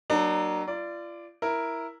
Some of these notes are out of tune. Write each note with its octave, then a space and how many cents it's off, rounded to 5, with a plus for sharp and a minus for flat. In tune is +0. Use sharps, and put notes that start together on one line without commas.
F#3 +25 A#3 +0 D4 +40
F4 -35 D5 +0
E4 +0 A#4 +0